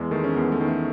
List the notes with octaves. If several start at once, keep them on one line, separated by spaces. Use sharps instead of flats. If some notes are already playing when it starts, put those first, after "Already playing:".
Already playing: E2 G#3
D#3 A3
C#4
E2 B3
A3
D#3
A3